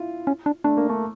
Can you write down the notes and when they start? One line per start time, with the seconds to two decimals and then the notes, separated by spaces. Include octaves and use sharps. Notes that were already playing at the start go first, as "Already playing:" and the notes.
Already playing: E4 F4
0.27 C#4
0.46 D4
0.64 A3 D4
0.77 A#3
0.89 A3